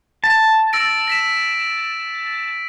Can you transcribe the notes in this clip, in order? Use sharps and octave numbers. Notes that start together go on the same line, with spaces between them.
A5
E6 A#6 D7
A#6 B6 E7